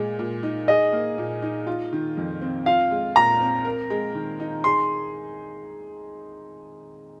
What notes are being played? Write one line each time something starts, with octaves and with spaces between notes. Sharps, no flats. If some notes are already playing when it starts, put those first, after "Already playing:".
Already playing: A#2 G#3 G#4
A#2
D#4
G#4 D#5
A#3
A#2
D#4
F4
D#3
F2
C4
F4 F5
G#3
A#2 A#5
C4
A#4
G#3
D#3
D#4
G#4 C6